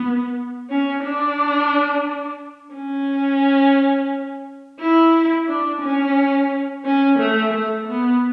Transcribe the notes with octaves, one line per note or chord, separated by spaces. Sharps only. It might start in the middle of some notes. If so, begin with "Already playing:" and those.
Already playing: B3
C#4
D4
C#4
E4
D4
C#4
C#4
A3
A3
B3